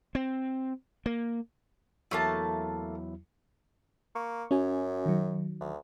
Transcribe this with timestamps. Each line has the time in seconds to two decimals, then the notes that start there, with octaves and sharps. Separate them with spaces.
0.15 C4
1.06 A#3
2.11 E2 F#3 A3 A#3 E4 A5
4.15 A#3 C#6
4.51 F#2 C#4 F#4 G#5
5.06 D#3 F#3
5.61 D2